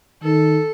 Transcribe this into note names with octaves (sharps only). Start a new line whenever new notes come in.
D#3 A4